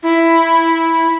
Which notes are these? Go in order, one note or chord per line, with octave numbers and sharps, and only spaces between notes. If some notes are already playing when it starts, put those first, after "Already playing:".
E4